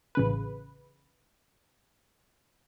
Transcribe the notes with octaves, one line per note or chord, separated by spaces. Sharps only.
A1 C#3 B4